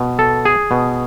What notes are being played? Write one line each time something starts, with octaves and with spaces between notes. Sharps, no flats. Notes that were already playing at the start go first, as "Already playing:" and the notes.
Already playing: B2
A4
G#4
B2